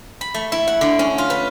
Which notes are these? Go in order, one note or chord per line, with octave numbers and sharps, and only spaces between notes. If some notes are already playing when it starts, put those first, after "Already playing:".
B5
A3
E4
F#5
D3
C#4
F4
B4